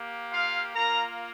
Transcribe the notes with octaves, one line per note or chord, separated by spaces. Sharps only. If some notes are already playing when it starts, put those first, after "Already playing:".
Already playing: A#3 G4
F4 F5
A#3 F4 A#4 A#5